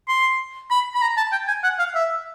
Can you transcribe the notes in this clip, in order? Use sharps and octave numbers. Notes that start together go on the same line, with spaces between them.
C6
B5
B5
A#5
A5
G5
G#5
F#5
F5
E5